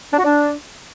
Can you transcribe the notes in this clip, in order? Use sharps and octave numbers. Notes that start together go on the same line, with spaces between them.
D4
F#4
D4